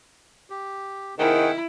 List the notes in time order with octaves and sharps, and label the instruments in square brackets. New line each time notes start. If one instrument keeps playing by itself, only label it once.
[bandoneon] G4
[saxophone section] C3 D#3 [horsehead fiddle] E4 [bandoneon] G#4 F#5 G5